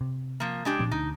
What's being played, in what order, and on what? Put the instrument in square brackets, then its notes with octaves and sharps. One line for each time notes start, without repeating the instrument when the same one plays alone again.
[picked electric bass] C3
[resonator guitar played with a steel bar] F3 A#3
G#3 D4 G4
[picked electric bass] A#2 F3 C4
[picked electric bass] D2 [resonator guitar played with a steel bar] D#4